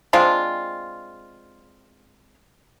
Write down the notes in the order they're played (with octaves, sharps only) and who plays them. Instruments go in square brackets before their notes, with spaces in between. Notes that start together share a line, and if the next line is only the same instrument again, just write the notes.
[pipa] G#3 C4 D4 F4